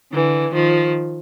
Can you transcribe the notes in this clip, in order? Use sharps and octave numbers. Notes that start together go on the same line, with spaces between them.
D3 E3
D#3 F3